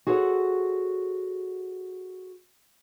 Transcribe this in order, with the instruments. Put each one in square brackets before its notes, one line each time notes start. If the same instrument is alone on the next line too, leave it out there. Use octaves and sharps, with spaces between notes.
[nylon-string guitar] F#4 G#4 A4 C5 C#5 F#5